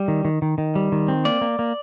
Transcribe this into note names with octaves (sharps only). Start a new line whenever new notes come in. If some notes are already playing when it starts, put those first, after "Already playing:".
Already playing: G3
D#3
D#3
D#3
D#3
G3
D#3
C4
A#3 D5
A#3
A#3